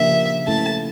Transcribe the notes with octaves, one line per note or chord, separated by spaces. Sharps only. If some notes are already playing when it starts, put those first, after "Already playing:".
Already playing: C#3 F3 A#3 D4 G4 E5
A3 C#4 E4 A4 A5